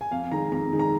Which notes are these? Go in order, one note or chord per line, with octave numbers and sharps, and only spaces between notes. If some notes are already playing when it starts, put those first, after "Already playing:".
G#5
F2 F5
D#3 G#3 A#5
F2 A#5
D#3 G#3
A#5